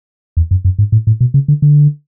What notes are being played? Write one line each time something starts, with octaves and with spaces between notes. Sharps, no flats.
E2
F#2
F#2
G#2
A2
A2
B2
C#3
D3
D3